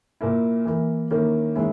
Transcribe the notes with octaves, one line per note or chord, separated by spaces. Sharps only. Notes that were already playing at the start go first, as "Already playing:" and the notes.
A#2 A#3 E4
E3 A#3 E4
D#3 A#3 C#4 E4
D#3 G#3 C#4 E4